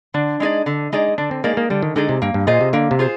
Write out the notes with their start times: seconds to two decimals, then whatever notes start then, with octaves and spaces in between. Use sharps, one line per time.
0.14 D3 D4
0.40 G#3 D#4 G#4 D5
0.66 D3
0.93 G#3 D#4 G#4 D5
1.18 D3 D4
1.31 C4
1.44 G#3 A#3 D#4 G#4 D5
1.57 A#3
1.70 D3 G3
1.82 D#3
1.96 D3 G#3 D#4 G#4 D5
2.09 C3
2.22 G2 A#3
2.34 G2
2.47 A#2 F4 G#4 C5 D#5
2.61 C3
2.73 D3 A#3
2.91 C3
2.99 F4 G#4 C5